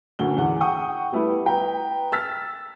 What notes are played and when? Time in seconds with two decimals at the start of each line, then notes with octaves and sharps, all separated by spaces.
0.19 F#1 D2 F#4 G7
0.37 E2 F#5
0.61 F#5 G5 C#6 D#6
1.12 G3 A3 B3 E4
1.46 B4 G5 A#5
2.12 E6 F6 A6 B6